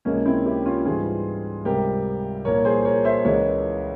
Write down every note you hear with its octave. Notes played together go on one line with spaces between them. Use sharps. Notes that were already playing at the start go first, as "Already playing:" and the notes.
C#2 C3 F3 G#3 A#3 C#4
C4 E4
E4 G4
C#4 F4
G#2 E3 G3 F4 G#4
C#2 C3 G3 G4 A#4
C2 A#2 F3 A#4 C#5
G#4 C5
A#4 C#5
C5 E5
C#2 C#3 E3 G#3 A#4 C#5